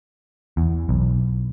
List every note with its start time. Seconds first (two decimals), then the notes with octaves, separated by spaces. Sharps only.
0.57 E2
0.89 B1